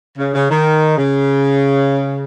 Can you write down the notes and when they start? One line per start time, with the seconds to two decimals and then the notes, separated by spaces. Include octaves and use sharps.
0.18 C#3
0.34 C#3
0.50 D#3
0.98 C#3